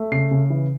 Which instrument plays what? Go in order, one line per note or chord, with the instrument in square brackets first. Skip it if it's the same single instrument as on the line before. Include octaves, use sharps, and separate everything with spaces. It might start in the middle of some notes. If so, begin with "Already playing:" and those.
Already playing: [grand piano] A3
C#3 C7
C#3
E3